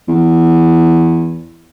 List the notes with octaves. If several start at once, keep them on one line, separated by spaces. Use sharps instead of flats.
E2